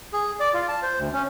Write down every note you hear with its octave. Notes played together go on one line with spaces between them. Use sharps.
G#4
D5
F4
A5
C5
D2
C#4